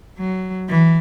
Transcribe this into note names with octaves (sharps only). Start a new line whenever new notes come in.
F#3
E3